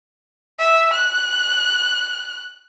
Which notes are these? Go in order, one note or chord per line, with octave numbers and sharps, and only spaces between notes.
E5
F#6